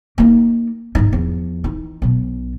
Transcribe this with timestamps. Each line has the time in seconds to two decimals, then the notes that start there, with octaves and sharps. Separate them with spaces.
0.18 A#3 D#4
0.95 G#2 D#4
1.12 E2 F3
1.64 E3 D#4
2.02 B1 B2